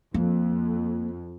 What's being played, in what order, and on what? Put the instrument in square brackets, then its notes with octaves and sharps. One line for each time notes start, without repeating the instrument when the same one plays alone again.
[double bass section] F2 [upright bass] A#3